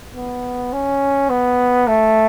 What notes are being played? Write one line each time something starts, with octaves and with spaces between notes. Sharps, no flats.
B3
C#4
B3
A3